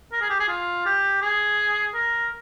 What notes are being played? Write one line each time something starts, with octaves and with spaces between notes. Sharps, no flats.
A#4
G#4
G4
G#4
F4
G4
G#4
A#4